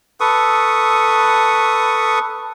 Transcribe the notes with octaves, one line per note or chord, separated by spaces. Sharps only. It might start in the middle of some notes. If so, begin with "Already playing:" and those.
A4 B4 C#6 D#6